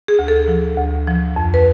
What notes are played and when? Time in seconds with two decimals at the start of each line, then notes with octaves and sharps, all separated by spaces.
0.08 G#4
0.19 D2
0.28 A4
0.48 F3
0.77 D2
1.07 F3
1.36 F2
1.54 B4